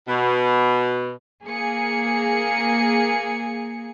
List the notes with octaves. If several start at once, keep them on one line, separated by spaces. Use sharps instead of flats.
B2
A#3 G#4 C#7